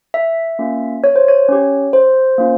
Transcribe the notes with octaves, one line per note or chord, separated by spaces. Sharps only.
E5
A#3 C#4 F4
C#5
C5
C#5
C#4 G4
C5
A#3 C#4 F4